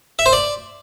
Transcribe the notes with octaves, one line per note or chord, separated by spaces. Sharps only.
E5
C5
D5